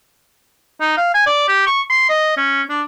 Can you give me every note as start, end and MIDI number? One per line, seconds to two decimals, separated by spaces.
0.80 0.95 63
0.97 1.10 77
1.14 1.23 80
1.26 1.47 74
1.48 1.63 67
1.66 1.81 85
1.90 2.09 84
2.09 2.34 75
2.37 2.62 61
2.70 2.82 62